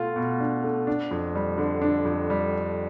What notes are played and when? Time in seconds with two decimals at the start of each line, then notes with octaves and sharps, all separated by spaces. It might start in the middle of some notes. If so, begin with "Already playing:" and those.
Already playing: B2 A3 F4
0.16 B2
0.40 D4
0.64 A3
0.87 D4
1.11 F2
1.35 G3
1.58 D3
1.82 D4
2.05 F2
2.30 G3